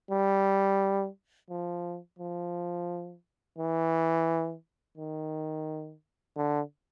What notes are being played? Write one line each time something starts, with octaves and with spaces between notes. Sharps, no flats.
G3
F3
F3
E3
D#3
D3